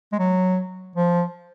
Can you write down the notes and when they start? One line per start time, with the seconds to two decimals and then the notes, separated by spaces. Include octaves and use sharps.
0.12 G#3
0.19 F#3
0.96 F3